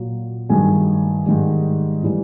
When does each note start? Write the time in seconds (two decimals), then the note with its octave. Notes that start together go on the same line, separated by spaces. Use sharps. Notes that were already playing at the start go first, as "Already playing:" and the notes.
Already playing: A#2 F#3
0.49 G2 D#3 F#3 G#4 G#5
1.26 G#2 D#3 G3
2.03 A2 E3 G3